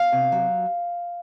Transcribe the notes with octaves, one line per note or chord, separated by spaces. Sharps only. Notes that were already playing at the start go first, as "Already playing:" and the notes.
Already playing: F5
C3
F#3